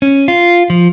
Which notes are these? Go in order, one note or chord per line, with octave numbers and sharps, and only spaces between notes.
C#4
F4
F3